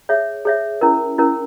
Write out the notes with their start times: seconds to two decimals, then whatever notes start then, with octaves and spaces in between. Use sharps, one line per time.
0.09 G#4 C#5 E5
0.45 G#4 C#5 E5
0.81 C#4 E4 A#4
1.18 C#4 E4 A#4